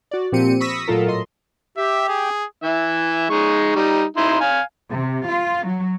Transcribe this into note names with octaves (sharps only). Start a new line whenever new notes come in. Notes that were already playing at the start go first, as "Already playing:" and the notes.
F#4 D5
A#2 F3 C4 G4 C#7 D#7
B5 C#6 D#6 E6 A#6 B6
A#2 F#3 A3 F4 A4 A#4
A2 D#5 C6
G4 E5
G#4
E3 E5
G#3 D#4 C#6
G3 D#4
D#4 E4 C6
F5 G#5
C3
F4
F#3